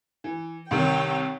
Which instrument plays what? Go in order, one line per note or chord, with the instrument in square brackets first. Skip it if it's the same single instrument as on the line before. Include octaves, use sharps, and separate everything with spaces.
[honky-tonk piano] E3
[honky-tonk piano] C2 C3 D#3 [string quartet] C#5 G5